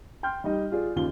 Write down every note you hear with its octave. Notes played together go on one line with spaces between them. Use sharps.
G5 C6 F6 G6
G3 D#4 D#5
F4 G#4 D5
D#2 C#3 F4 G7